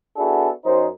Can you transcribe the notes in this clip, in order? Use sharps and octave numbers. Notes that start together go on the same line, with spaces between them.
B3 D4 E4 F#4 G#4 A4
F#2 D#4 C5